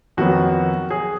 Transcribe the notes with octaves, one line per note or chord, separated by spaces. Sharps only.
F2 D#3 F#3 B3 F#4
G#4